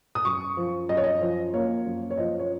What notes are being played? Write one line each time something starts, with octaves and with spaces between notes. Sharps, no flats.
D#6
F#2 C#6
F3
F#2 D#5
C#5
D#5
F3
A#3 C#5
F#2
C#5
F3 D#5
C#5